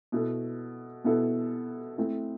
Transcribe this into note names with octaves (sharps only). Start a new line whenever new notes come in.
B2 B3 E4 A4
B2 B3 E4 A4
A3 C4 E4 A4